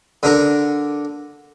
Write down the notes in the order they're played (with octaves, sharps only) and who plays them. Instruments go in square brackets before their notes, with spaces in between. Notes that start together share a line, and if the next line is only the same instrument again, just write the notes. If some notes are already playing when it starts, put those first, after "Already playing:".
[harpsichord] D3 D4 A#4